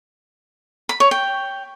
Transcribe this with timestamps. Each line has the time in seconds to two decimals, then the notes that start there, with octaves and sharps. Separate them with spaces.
0.89 B5
1.00 C#5
1.11 G5